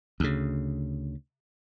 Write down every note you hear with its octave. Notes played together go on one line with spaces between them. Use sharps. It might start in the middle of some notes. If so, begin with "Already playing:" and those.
D2 C#3